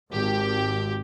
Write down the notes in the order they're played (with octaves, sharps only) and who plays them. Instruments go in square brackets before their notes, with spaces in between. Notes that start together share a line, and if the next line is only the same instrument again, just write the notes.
[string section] G#1 G4